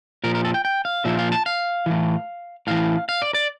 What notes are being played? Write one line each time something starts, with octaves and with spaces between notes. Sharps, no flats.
A#2 F3 A#4
A#4
A4
G5
G5
F5
A#2 F3 E5
F5
A5
F5
A2 E3
A2 E3 F5
F5
D5
D5